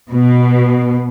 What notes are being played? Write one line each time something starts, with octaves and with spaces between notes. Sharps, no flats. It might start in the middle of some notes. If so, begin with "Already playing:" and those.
B2